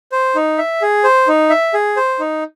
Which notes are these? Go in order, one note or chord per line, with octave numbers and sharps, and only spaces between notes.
C5
D#4
E5
G#4
C5
D#4
E5
G#4
C5
D#4